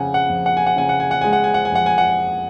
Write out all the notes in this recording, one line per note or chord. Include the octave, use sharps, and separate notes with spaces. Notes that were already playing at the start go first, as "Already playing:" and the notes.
Already playing: F2 C#3 F#5 G#5
F#5
F2
F#5
G#5
F#5
C#3 G#5
F#5
G#5
F#5
G#3 G#5
F#5
G#5
F#5
G#5
F2 F#5
G#5
F#5